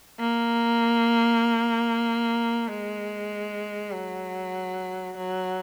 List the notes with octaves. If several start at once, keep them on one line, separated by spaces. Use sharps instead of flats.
A#3
G#3
F#3
F#3